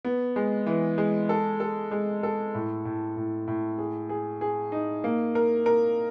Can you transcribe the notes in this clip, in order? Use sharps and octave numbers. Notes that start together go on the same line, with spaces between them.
B3
G#3
E3
G#3
A4
A4
G#3
A4
A2
A2
A2
A2
G#4
G#4
G#4
D#4
A#3
A#4
A#4